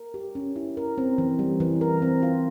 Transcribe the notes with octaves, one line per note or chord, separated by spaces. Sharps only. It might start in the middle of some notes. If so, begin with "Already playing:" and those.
Already playing: A#4
G4
C#4
E4
A#4
C4
E3
G3
E3
A#4
C4
F4